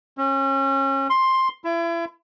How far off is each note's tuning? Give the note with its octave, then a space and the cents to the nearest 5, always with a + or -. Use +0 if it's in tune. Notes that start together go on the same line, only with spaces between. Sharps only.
C#4 -30
C6 +10
E4 +35